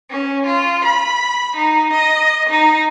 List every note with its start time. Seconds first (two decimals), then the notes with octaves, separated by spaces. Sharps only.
0.10 C#4
0.46 F4
0.85 B5
1.56 D#4
1.93 D#5
2.50 D#4